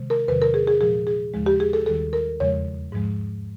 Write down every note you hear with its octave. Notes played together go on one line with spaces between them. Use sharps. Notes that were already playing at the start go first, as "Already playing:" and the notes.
Already playing: C3 D#3 G#3
A#4
E2 C3 D#3 F#3 B4
A#4
G#4
G#4
A#2 F3 G#3 G#4
G#4
D#2 C#3 F3 G#3
G4
G#4
A4
D#2 D#3 G3 A4
A#4
E2 C#3 F3 G#3 C#5
G#2 F3 G#3